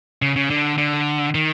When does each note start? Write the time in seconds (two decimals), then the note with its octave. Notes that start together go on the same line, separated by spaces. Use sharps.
0.22 C#3
0.36 C#3
0.50 D3
0.78 D3
1.35 D#3